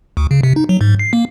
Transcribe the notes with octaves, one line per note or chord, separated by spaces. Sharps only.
D2
C#3
C3
D#4
F#3
G#2
C7
A#3